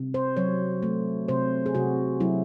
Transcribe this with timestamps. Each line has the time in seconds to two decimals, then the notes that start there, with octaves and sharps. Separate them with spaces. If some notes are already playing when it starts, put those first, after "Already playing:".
Already playing: C3
0.14 C5
0.37 F#3 C#5
0.83 A3
1.28 C3 C5
1.66 G#4
1.75 C3 F#4
2.20 F#3 E4